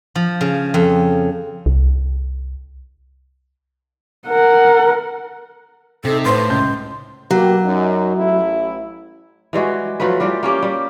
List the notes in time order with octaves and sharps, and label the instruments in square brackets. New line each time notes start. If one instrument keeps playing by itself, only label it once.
[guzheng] F3
C#3
F2
[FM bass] C2
[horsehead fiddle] A#4 F#5
[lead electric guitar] C3 [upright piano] C4 D#4 [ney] A4
[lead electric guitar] A2 [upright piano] B4 C5 [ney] C6
[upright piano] C#2 G6
[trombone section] B2 A#3 G4 [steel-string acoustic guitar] F#3
[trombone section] F#2 D#4
A1 E4
[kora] E3 G3 G#3 F#4
F3 F#3 A3 B4
E3 G3 F4 G4
A#3 C#4 G4
G3